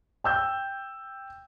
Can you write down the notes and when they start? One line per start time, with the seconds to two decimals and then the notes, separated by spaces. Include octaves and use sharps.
0.24 G5 E6 G6